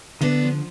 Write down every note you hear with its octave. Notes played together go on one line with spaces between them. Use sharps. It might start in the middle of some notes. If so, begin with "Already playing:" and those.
D3 B3 D4
F3